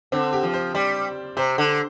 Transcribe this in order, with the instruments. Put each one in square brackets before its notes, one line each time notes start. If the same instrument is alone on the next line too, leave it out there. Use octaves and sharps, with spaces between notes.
[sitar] D3 [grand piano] C4
[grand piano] G4
[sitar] F3
[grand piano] C5
[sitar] G3 [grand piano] D5
[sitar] C3 [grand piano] C5
[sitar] D3